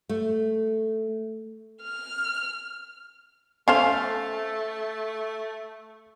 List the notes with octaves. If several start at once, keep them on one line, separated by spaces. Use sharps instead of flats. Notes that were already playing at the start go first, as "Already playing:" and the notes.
A3
F6
A3 C#4 A4 C5 F5